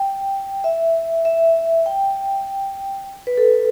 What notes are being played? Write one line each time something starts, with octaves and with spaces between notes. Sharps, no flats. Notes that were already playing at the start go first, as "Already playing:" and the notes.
Already playing: G5
E5
E5
G5
B4
A4